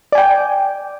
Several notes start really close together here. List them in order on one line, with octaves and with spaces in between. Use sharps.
D5 G#5 G5